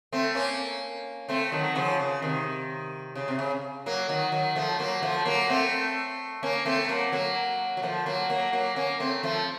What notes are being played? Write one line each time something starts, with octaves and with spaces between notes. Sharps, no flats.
A3 C4
A#3 C#4
A3 C4
D#3 F#3
C#3 F3
C#3
C3 D#3
C#3
C3
C#3
F#3 A#3
D#3 F#3
D#3 F#3
F3 A3
F#3 A#3
F3 A3
F#3 A#3
A3 C4
A#3 C#4
A3 C4
F#3 A#3
F#3 A#3
F#3
F3 A3
F#3 A#3
F#3 A#3
F#3 A#3
A#3 C#4
A3 C4
F3 A3